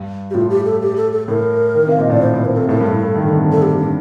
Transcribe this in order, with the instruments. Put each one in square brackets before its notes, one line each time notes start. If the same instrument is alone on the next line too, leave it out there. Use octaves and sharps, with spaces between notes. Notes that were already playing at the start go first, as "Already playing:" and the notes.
Already playing: [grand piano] G2
[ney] G4
[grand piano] A2 [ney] F4
[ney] G4
A4
G4
A4
A4
[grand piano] A2 [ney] A#4
[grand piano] D#3
C3
[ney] F5
[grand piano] A#2 [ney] D#5
[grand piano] A2 [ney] D5
[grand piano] A2 [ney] C5
[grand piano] A2 [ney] C5
[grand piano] A2 [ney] A#4
[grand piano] C3 [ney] A4
[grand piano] A2 [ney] A4
[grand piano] G2 [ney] A#4
[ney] A4
[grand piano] A2
D#3
D3
C3
D3
[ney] A4
G4
D4